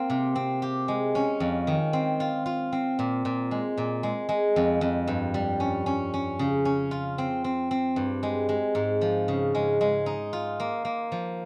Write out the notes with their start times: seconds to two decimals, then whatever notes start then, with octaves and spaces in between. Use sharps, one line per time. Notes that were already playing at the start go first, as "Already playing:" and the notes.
Already playing: A#3 C4 F4
0.10 C3
0.35 C4
0.62 G4
0.88 G#3
1.15 C#4
1.40 F2
1.67 D#3
1.93 C4
2.20 F4
2.46 F4
2.72 C4
2.99 A#2
3.25 A#2
3.51 G#3
3.77 A#2
4.03 G#3
4.29 G#3
4.56 F2
4.81 F2
5.07 G2
5.34 G3
5.60 C#4
5.86 C#4
6.14 C#4
6.39 C#3
6.65 C#4
6.91 F4
7.18 C4
7.44 C4
7.71 C4
7.96 G2
8.23 G#3
8.49 G#3
8.75 G#2
9.01 F3
9.28 C#3
9.55 G#3
9.81 G#3
10.06 D#4
10.33 F4
10.60 A#3
10.85 A#3
11.12 F3